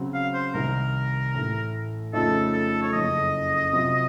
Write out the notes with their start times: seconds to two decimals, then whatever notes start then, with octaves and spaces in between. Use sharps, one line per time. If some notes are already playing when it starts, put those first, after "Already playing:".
Already playing: C#3 F#3 C4
0.14 F5
0.34 C5
0.54 C2 C3 D#3 A#4
1.34 A1 A2 A3
2.13 F2 C#3 F3 A3 D#4 A4
2.53 A4
2.82 C#5
2.93 F#1 F2 C#3 D#5
3.73 C3 F#3 C4 F4